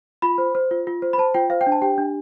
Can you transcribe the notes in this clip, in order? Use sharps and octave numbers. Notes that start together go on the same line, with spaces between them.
F4 B5
C5
C5
F4
F4
C5
B5
C5 A5
F4 G5
C5 F5
G5
D4
A5
G4 G5
D4